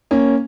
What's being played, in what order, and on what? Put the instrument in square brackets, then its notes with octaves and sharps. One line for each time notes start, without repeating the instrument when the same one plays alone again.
[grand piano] A#3 C#4